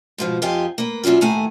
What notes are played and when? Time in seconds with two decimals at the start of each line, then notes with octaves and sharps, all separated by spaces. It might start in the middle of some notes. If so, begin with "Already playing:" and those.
0.18 G#2 B2 F3
0.42 F2 F4 G4 D#5 G#5
0.78 A#3 B4
1.03 A#2 F#3 C#4 E4 F4
1.21 D#2 A2 A3 E4 G#5 A#5